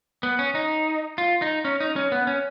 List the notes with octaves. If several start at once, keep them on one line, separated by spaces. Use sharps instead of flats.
B3
C#4
D#4
F4
D#4
C#4
D#4
C#4
B3
C#4